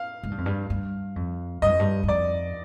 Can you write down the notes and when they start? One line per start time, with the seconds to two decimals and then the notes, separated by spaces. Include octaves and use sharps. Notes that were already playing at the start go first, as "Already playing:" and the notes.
Already playing: F5
0.23 G#2
0.31 G2
0.38 F2
0.46 G2
0.70 G2
1.16 F2
1.62 G2 D#5
1.70 F2
1.79 G2
2.03 G2
2.08 F2 D5